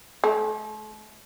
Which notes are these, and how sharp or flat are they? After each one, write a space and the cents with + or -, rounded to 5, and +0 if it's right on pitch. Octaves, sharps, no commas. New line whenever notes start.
A3 -45